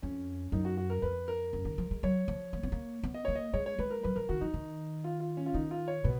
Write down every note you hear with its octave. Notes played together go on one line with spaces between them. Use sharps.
F2 C#4
F#2 D#4
F#4
F#4
A#4
F2 B4
A#4
F#2
D#3
F3
G#3
F#3 C#5
F3
A#3
B3
A#3
B3
D#5
A#3 C#5
D#5
G#3 C#5
C#5
G#3 B4
A#4
F#3 B4
F3 A#4
D#3 F#4
F3 D#4
D#3
F4
F4
C#4
F4
D#3 D#4
F4
C#5
B2 B4